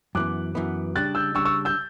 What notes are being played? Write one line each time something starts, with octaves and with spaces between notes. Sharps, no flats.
F#2 E3 B3 D6 F#6
F#2 E3 B3
C#3 G3 D4 F#6 A6
E6 G6
C#3 G3 D4 C#6 E6
C#6 E6
E6 G6